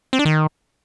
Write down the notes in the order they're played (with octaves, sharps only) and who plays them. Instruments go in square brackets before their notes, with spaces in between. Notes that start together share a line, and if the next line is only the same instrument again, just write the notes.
[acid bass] C4
D4
D#3